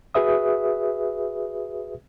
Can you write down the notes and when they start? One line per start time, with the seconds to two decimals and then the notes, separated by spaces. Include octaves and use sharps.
0.14 F#4 G#4 B4 E5 D#6